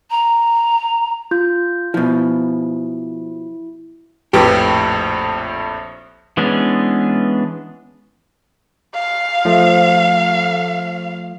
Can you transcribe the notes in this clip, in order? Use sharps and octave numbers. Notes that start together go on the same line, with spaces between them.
A#5
F4 G6
B2 F3 E4
A#1 F2 A2 G4 B4
E3 G#3 B3 C#4 D4
F5
F3 A3